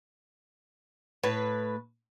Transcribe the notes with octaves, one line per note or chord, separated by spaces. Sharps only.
A2 B4